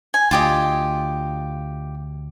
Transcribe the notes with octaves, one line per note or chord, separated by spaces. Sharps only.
G#5
D2 F4 G4 D#5